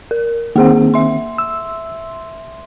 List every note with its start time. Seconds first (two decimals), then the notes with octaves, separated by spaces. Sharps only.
0.11 A#4
0.56 D#3 A#3 C4 G#4 F#5
0.94 E5 C6
1.38 E6